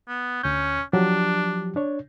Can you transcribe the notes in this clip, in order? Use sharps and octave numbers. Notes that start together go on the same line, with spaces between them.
B3
D2 C#4 G6
F3 F#3 D4 G4
D4 C#5